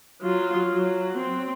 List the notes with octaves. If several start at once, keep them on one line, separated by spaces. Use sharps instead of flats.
F#3 F4
F#3
C4